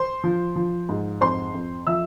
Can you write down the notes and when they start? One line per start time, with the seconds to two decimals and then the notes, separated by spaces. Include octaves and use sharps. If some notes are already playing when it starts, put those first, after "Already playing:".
Already playing: C5 C6
0.24 F3
0.56 F3
0.89 G#2
1.21 F2 C5 C6
1.54 F2
1.87 F3 E5 E6